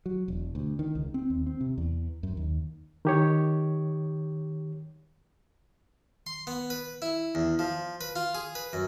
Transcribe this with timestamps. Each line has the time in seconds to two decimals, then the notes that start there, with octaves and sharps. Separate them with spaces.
0.06 F#3
0.28 E1
0.55 D2
0.79 D#3
0.95 C#2
1.14 C4
1.30 D#2
1.46 C4
1.61 C3
1.78 E2
2.23 F#2
2.37 D#2
3.05 D#3 G4 C#5
6.26 C6
6.47 B3
6.70 B4
7.02 E4
7.35 E2
7.59 F3
8.01 B4
8.16 F4
8.35 G#4
8.55 B4
8.73 F#2